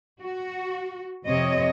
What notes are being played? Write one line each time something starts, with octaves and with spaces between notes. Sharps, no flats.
F#4
F2 C3 C4 C#5 D#5